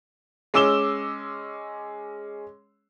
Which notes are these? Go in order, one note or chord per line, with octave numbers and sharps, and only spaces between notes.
G#3 C#4 D6 E6 E7 G7